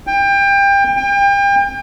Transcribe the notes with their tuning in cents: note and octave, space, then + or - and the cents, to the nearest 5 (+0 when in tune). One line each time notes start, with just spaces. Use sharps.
G5 +25
G5 +35